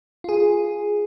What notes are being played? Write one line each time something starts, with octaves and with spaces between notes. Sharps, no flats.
F4 G#4